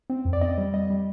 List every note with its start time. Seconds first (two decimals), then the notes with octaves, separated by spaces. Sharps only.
0.10 C4
0.25 F2
0.33 D5
0.41 C4 D#5
0.58 G3
0.74 G3 D#5
0.90 G3